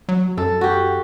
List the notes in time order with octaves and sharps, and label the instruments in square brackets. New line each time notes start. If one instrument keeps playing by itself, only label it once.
[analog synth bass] F#3
[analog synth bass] F#2 [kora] A4
[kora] F#4 G4